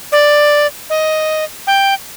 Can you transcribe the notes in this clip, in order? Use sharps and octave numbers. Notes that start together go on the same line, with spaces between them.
D5
D#5
G5